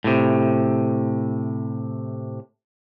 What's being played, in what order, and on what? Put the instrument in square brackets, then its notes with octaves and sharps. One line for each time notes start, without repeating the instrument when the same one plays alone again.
[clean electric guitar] A2 C3